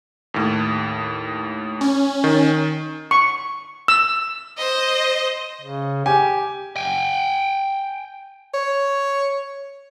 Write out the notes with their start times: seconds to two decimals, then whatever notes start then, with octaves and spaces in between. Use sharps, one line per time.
0.34 D#2 A2
1.81 C#4
2.24 D#3
3.11 C#6
3.88 E6
4.58 C5 D#5
5.61 C#3
6.06 G4 G#5
6.76 G5 G#5
8.54 C#5